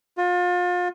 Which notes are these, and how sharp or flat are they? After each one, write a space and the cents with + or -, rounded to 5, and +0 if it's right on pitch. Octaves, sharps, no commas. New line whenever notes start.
F4 +35